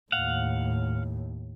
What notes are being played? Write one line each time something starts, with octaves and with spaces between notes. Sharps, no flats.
D#2 A2 F5 F#5